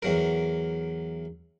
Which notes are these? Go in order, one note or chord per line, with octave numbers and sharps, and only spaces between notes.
E2 F#3 A#4